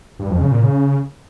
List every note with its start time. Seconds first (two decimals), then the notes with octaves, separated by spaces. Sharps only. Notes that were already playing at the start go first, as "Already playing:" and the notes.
0.20 G2
0.30 F2
0.41 C#3
0.51 A#2
0.62 C#3